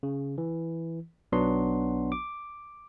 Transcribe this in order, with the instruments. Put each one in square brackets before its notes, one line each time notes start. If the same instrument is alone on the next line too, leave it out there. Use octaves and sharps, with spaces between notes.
[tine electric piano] C#3
E3
B1 F#3 B3 D4 F#4 C6
D6